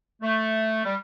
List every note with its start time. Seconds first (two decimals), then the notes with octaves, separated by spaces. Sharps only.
0.22 A3
0.85 G3